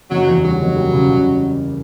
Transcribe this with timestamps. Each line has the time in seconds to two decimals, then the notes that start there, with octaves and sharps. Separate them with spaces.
0.11 F#1 F#3
0.27 E2
0.44 F#3 G3
0.60 F#1
0.77 G3
0.93 C#3
1.10 C#3